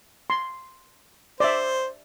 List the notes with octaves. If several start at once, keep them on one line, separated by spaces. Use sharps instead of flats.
C6
C5 D5 E5